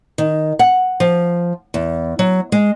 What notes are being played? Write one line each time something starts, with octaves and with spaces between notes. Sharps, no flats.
D#3
F#5
F3
E2
F#3
G#3